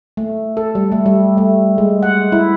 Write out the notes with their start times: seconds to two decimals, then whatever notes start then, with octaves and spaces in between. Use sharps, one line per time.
0.17 A3
0.57 A4
0.75 G3
0.92 A3
1.06 G3
1.38 A3
1.78 G#3
2.03 F#5
2.32 E4